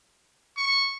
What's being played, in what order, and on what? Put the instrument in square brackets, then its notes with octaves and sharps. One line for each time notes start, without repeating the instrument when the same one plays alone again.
[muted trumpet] C#6